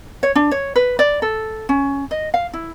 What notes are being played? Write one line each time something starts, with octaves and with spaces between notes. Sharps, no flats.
C#5
D4
C#5
B4
D5
A4
C#4
D#5
F5
E4